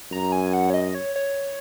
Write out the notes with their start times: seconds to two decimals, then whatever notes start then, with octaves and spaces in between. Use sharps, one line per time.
0.12 F#2 A#5
0.32 G#5
0.53 F#5
0.70 C#5
0.74 D#5
0.95 C#5
1.16 C#5